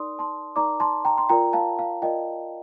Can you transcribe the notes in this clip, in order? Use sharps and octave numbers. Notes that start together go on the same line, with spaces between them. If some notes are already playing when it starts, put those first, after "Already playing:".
Already playing: D#4 A#4 D5 C6 D#6
A5 C6
D#4 A#4 D5 A#5 D6
A5 C6
G5 A#5
C6
F4 A#4 D5 G5 A#5
F5 A5
F5
F4 A#4 D5 D#5 G5